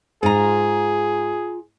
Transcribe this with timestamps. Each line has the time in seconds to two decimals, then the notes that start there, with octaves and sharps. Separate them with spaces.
0.23 G#2 F4 G#4 A#5